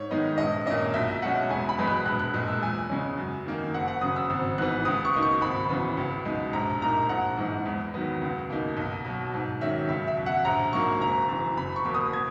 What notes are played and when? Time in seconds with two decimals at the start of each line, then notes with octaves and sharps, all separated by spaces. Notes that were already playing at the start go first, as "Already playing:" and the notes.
Already playing: G#2 C#5
0.11 D#3 G#3 B3 D#4
0.38 A#1 D#5
0.66 A#2 A#3 C#4 D#5
0.94 B1 E5
1.22 B2 G#3 C#4 F#5
1.50 E1 G#5
1.69 B5
1.79 E2 B2 G#3 B3
1.87 F#6
2.06 A#1 F#6
2.19 F#6
2.34 A#2 G#3 F#6
2.48 E6
2.63 E2 G#5
2.90 C#3 G#3 C#4
3.17 F#2
3.46 D#3 A#3 D#4
3.74 F#1 F#5
3.88 F#5
4.01 F#2 C#3 D#6
4.16 E6
4.30 G#1
4.58 G#2 E3 B3 F#6
4.85 C#2 D#6
5.05 C#6
5.14 B2 A#3 D#4
5.22 C#6
5.41 G#1 B5
5.69 F#2 C#3 E3 B3
5.97 C#2
6.25 B2 G#3 D#4
6.53 A#1 A#5
6.81 A#2 A#3 D#4 A#5
7.09 A#1 F#5
7.37 G#2 E3 G#3
7.66 E2
7.94 D#3 F#3 B3
8.22 C#2
8.50 B2 A#3 D#4
8.77 B1
9.05 B2 F#3
9.34 G#2
9.61 D#3 F#3 C#4 E5
9.89 C#2 E5
10.08 E5
10.17 B2 F#3
10.26 F#5
10.45 A#1 A#5
10.73 G#2 F#3 A#3 C#6
11.00 F#1 A#5
11.28 F#2 E3
11.56 F#1 B5
11.76 C#6
11.85 E2 B2 A#3
11.94 D#6
12.13 G#6